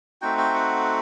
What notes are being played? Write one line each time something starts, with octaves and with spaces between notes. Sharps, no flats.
A3 C4 D#4 F#4 G5
G5
F#5